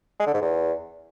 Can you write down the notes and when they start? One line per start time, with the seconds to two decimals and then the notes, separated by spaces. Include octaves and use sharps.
0.20 G#3
0.27 D3
0.34 G#2
0.41 E2